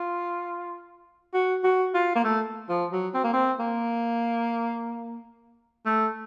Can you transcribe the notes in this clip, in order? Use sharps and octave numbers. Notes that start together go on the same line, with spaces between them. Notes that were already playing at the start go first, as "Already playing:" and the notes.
Already playing: F4
F#4
F#4
F4
A#3
A3
F3
F#3
C4
A#3
C4
A#3
A3